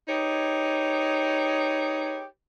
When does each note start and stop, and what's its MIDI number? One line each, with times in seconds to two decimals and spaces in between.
0.08 2.24 63
0.08 2.24 67
0.08 2.24 68
0.08 2.24 71
0.08 2.24 73